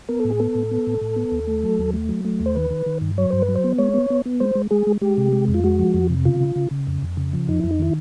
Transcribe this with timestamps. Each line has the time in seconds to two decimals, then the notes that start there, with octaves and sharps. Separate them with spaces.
0.09 B3 A#4
0.20 A2 A4
0.31 G#4
0.40 B3 A4
0.55 A2
0.71 B3
0.87 A2
1.01 A2
1.16 B3
1.32 D#2
1.47 A3
1.63 F#3
1.78 D#2
1.93 A3
2.09 F#3
2.25 A3
2.40 D#2
2.46 C5
2.55 D#3 B4
2.70 D#3
2.86 D#3
3.01 G2
3.18 F#3 C#5
3.30 G2 C5
3.42 B4
3.49 F#3
3.56 C5
3.64 B3
3.78 G#3 C#5
3.94 B3
4.10 B3
4.26 B3
4.40 G#3 C5
4.55 G#3
4.71 G#3 G#4
4.87 G#3
5.01 G#3 G4
5.17 C3
5.33 G#3
5.48 F2
5.54 F4
5.64 G#3 F#4
5.79 F3
5.94 F2
6.10 C3
6.25 C#3 F4
6.41 C#3
6.56 C#3
6.71 C#3
6.87 F2
7.02 F2
7.17 C#3
7.33 F3
7.48 F2 D#4
7.60 F2 E4
7.70 D#4
7.79 D#3 E4